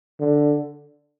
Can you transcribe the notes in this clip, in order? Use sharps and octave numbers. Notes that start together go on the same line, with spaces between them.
D3